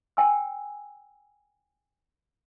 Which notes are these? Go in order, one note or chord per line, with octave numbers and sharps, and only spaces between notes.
G5 G#5 E6